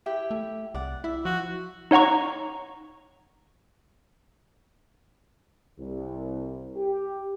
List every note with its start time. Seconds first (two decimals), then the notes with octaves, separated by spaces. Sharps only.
0.06 E4 G4 G5
0.31 A3
0.74 C2 D5 F#5
1.04 E4 E5
1.25 F3 F#4
1.91 D#4 C#5 F#5 A#5 C#6
5.79 C2
6.76 G4